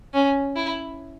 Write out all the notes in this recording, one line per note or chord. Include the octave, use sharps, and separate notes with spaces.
C#4
E4